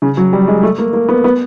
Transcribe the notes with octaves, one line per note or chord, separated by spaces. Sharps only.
C#3
F#3
G3
G#3
A3
A#3
A#3
B3
B3